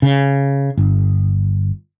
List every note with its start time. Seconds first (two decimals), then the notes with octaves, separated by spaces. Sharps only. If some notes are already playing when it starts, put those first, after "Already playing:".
0.02 C#3
0.77 G1